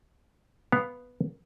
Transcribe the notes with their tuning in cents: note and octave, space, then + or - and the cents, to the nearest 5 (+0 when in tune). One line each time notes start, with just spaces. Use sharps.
B3 +0 F5 +0